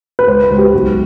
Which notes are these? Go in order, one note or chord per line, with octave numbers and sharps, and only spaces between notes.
B4
C#2 C5
B4
C#2
G4
B1 F#4